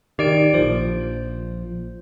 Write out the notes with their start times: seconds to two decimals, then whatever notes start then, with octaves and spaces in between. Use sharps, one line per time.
0.19 D#3 G4 D5 D7
0.54 A#1 F3 C5